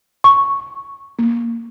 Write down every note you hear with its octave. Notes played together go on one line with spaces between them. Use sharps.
C#6
A#3